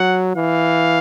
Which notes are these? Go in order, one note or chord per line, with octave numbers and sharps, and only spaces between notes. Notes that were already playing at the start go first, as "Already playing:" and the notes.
Already playing: F#3 F#5
E3 F5